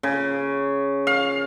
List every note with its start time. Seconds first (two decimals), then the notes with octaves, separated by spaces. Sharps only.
0.03 C#3
1.07 F5